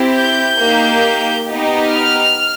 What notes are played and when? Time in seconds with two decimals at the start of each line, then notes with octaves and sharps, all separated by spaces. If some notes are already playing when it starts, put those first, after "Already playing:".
Already playing: C4 E4 G4
0.14 G6
0.59 A#3 D#4 G4
1.48 B3 D#4 G4
1.92 F6